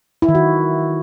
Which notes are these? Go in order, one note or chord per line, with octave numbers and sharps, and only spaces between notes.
E4
D#3
F#4